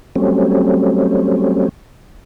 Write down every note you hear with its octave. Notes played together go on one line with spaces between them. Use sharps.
F#3 G3 A3 C4 C#4